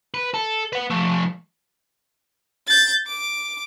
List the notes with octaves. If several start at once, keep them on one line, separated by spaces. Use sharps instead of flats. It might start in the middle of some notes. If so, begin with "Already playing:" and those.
B4
A4
B4 F#5
F3 A3
G6 A6
D6